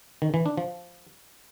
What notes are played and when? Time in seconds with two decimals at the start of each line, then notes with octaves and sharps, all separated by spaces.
0.22 D#3
0.34 E3
0.46 D4
0.57 F3